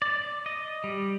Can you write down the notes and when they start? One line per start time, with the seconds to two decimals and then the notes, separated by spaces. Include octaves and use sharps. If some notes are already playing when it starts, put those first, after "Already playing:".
0.02 D5
0.46 D#5
0.84 G3